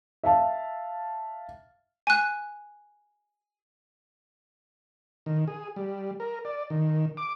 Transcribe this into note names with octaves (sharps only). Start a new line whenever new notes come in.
E5 F5 A5
G#5 F#6
D#3
G#4
G3
A#4
D5
D#3
D6